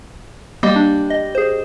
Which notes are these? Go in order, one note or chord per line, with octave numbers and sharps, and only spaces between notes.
G3 A#3 D#5
D4
D#5
G#4 C5